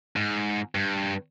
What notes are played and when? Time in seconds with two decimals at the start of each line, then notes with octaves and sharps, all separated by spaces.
0.16 G#2
0.75 G2